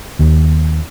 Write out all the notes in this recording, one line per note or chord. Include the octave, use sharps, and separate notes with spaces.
D#2